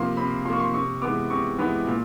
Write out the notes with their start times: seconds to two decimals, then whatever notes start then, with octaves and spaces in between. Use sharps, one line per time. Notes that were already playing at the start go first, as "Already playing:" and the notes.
Already playing: C3 F3 A#3 C6
0.17 C3 B5
0.45 F3 C6
0.50 A#3 C#6
0.60 C6
0.74 C3 C#6
1.02 E3 G#3 B3 D6
1.30 C3 C#6
1.59 E3 G#3 B3
1.87 A#2